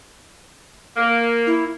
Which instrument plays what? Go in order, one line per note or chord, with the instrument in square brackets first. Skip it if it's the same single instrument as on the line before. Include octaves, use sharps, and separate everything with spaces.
[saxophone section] A#3
[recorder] E4